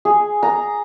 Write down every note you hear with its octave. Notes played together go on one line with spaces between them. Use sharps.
G#4
A#5